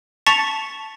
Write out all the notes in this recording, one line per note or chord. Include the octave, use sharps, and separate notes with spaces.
A5 C#6 A6 B6 C#7 F7